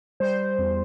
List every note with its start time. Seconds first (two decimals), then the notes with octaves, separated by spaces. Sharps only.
0.20 G3 C5
0.59 E2